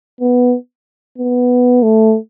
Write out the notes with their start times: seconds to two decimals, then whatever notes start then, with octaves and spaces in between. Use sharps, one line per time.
0.21 B3
1.18 B3
1.83 A3